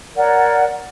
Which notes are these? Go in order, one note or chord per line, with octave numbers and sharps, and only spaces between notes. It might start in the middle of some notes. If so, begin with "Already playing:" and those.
A#4 C#5 D5 F#5